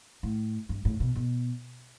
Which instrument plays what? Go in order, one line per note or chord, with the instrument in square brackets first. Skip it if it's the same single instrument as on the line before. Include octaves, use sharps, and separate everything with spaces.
[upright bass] A2
G2
A2
B2
B2